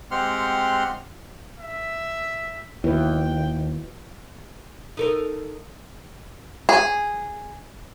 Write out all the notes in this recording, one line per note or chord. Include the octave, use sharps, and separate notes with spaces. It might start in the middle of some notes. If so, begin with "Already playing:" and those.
G#3 C4 G4 F#5 C6 F6
E5
D#2 E4 F#4 B4 G5
D#4 A4 A#4
G#4